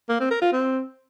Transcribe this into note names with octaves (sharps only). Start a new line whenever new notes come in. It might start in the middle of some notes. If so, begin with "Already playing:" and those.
A#3
C4
A#4
F4
C4